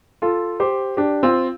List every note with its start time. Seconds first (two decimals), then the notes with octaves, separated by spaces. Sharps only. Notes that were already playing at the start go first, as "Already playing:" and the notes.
0.22 F4 A4
0.60 G4 C5
0.97 D4 G4
1.23 C4 F4